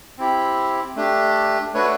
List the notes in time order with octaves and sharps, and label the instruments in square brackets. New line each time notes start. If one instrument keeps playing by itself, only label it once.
[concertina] C4 E4 G4
A3 D4 G4
A3 D4 F#4 B4 C#5